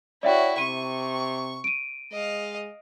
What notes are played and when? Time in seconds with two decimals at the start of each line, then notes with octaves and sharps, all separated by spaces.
0.23 E4 F#4 C#5 D5 E5 G5
0.58 C3 C#6 D#7
1.64 D7 D#7
2.12 G#3 D#5 F5